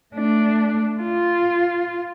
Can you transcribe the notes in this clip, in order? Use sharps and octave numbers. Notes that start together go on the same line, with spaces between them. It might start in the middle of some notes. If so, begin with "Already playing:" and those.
A3 D4
F4